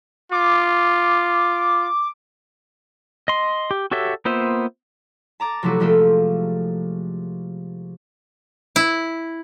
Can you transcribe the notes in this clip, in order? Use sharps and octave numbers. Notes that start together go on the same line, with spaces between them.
F4 D6
D#5 C6
G4
F#4 G4 A4 C#5 E5
A#3 B3 F4 C5 E5
A5 A#5 D6 A6
C3 F3 F#3 A3 E4 F#4
F3 G#3 A3 F4 A4
E4